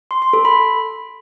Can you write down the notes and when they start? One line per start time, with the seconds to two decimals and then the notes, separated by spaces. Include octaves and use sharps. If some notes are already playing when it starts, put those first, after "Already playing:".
0.11 C6
0.22 C6
0.33 A4
0.45 B5